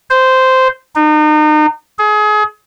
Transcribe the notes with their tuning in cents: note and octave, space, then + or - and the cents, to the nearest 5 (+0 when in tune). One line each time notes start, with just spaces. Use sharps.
C5 -10
D#4 -35
G#4 +30